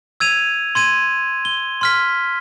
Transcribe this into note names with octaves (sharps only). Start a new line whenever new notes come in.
E6 G#6 D#7 F7
C6 G#6 D#7
G7
C6 F6 B6